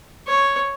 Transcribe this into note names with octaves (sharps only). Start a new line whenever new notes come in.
C#5